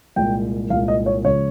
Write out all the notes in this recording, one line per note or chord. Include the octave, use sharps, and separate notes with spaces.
C2 A#2 G#3 G5
C2 A#2 G#3 F5
D#5
C#5
C#2 C#3 F3 C#5